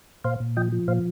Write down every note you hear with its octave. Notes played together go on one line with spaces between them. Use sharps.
A#2 C5 F5
A#2
F3 D#5 G5
F3
A#2 C5 F5